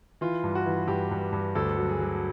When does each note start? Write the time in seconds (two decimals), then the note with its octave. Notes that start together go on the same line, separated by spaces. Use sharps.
0.21 E3 F4
0.44 G2
0.55 F#4
0.66 E3
0.88 G2 G4
1.11 G2
1.32 G2
1.55 D2 A4
1.78 F#3
1.89 G#4
1.99 F#3